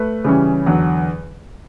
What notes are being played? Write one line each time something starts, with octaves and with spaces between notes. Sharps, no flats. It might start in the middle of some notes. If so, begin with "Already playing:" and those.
Already playing: A3 B4
C#3 E3 G3 C#4
E2 D3 F#3